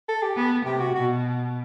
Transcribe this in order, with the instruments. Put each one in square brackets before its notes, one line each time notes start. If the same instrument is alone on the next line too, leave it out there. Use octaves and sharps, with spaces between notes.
[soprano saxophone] A4
G4
[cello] B3 [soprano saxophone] A4
[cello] C3 [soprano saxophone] G4
[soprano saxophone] F#4
[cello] B2 [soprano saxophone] F#4